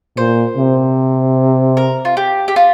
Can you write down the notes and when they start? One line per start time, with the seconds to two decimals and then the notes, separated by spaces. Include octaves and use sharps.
0.17 A#2 C5
0.57 C3
1.77 A#4
2.05 F4
2.17 G4
2.48 G4
2.56 F4